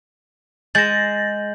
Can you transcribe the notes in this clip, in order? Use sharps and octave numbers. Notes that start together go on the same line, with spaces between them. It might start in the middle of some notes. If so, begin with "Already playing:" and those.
G#3 G6 A6 A#6 F#7